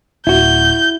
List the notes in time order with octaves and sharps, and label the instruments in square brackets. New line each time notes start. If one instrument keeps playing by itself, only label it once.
[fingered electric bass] D1 [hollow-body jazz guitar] E4 F#4 [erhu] G6